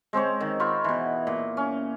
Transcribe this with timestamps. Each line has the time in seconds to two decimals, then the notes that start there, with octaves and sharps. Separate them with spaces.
0.13 G#3 C4 C5 C#5
0.41 D#3
0.60 F4 C5 B5 C#6
0.84 B2 E3
1.27 A#2
1.57 C#4